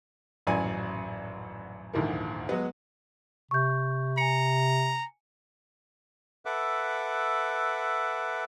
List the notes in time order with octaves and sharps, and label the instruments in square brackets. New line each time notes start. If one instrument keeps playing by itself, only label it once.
[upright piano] D#1 A1 F#2 F#3 D5 G#5
D#1 D2 G#2 E3 F3 A#3
F#3 G#3 B3
[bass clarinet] C3 [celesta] C#6 G6
[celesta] G#5 C#7 [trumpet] A#5
[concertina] A4 B4 E5 F#5 D6